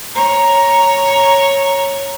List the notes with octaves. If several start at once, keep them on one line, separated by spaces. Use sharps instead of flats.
C#5 A#5